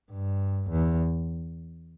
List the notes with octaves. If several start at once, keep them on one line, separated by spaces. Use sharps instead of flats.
G2
E2